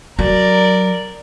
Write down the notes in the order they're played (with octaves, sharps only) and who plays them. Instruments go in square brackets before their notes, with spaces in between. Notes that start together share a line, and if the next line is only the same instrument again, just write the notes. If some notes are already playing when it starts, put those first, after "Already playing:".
[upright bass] F#3 [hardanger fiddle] A#4 D5